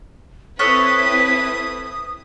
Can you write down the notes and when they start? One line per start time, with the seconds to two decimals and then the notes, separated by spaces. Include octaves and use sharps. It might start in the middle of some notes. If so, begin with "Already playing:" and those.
0.59 C4 E4 A4 B4 C#5 D#6 F#6 B6